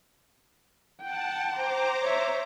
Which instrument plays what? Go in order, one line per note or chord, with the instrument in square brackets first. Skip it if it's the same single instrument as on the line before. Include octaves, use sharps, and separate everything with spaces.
[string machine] F#5 A5 [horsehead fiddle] G5
[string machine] C5 A#5 D6
[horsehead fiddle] C#5 E5